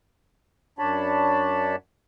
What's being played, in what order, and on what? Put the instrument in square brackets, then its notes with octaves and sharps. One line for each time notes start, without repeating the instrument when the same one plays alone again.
[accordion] F#2 D4 C#5 A5 B5